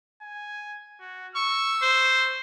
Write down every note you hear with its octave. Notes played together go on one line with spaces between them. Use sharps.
G#5
F#4
C#6 E6
C5